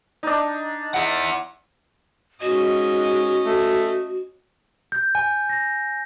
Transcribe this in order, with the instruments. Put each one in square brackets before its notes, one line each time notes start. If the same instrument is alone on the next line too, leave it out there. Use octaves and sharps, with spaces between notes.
[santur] D4 D#4
[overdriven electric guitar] E4 F#5
[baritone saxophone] G#2 [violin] C#4 D#5 [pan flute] F#4
[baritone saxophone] A3
[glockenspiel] G6
G#5
A#6